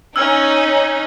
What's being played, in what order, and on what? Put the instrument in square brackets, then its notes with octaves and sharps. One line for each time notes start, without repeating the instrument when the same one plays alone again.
[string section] C#4 D#4 [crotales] E6 F6 G#6